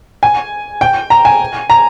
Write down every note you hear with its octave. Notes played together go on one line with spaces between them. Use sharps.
G#5
G5
A#5
G#5
A#5